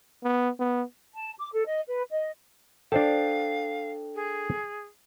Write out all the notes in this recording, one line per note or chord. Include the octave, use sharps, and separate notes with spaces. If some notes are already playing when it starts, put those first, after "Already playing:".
B3
B3
A5
D6
A4
D#5
B4
D#5
D4 A4 C5 F5 G5 A5
G#4